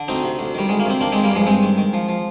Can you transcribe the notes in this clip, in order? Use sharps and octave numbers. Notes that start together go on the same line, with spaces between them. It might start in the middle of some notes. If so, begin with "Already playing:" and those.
Already playing: D3
D2 C4 D#4
C3
D2
D#3 G3
D2 G#3
A#3
C3 C4
D#3 A#3 D4
D#3 G#3 C4
G3 A#3
G2 F3 G#3
G2 G#3 C4
D#3
D#3
F3
F3